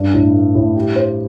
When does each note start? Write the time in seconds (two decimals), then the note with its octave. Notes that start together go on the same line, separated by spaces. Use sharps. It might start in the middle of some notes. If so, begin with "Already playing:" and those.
Already playing: G2 D4
0.14 A2
0.33 A3
0.55 A2
0.76 G4
0.96 C5